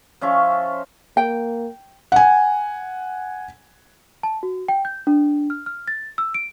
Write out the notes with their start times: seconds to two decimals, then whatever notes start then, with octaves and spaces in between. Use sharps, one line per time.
0.21 F3 C#4 E5 C#6
1.17 A#3 G5
2.12 F#5 G#5
4.23 A5
4.43 F#4
4.68 G5
4.85 G6
5.07 D4
5.50 F6
5.66 F6
5.88 A6
6.18 E6
6.34 D7